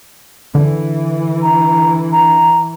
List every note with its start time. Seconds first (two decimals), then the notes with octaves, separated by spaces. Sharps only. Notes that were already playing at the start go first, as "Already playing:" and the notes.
0.55 D3 E3
1.42 A#5
2.12 A#5